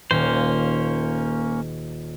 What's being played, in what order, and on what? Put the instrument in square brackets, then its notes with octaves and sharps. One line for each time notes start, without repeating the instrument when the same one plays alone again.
[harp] D#1 [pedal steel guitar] A#3 C#4 C5